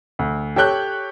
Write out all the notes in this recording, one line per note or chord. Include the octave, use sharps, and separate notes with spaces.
D2
G4 A4 C#5 G5 F#6 G6